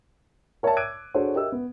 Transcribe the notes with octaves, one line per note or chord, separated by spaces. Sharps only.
A#4 C#5 D5 E5 G5 A5
D6 E6 F#6 G#6 D7 D#7
D4 F#4 G#4 A4 C5 C#5
G4 A#4 D#5 E5 E6
B3